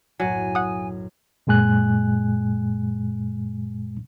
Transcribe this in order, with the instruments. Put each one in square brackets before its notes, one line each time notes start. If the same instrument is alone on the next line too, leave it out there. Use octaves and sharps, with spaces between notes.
[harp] B1 F#2 A2 [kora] F#3 [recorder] G#5
[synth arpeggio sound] F#5 D#6
[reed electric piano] F#2 A#2 G#3 G#5 F#6